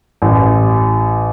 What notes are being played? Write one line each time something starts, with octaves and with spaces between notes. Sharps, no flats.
A1